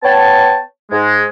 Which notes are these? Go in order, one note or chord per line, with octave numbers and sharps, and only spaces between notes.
B3 C#5 G5 A5
G#2 G#3